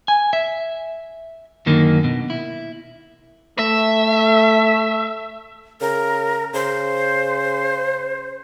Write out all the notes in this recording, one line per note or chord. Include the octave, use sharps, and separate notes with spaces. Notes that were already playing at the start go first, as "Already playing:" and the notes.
G#5
E5
F#2 D3 D#3 A#3 D#4
B2
E4
A3 E5
C#3 A#4
C#3 C5